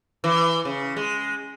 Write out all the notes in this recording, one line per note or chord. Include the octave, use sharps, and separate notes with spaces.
E3
C#3
G#3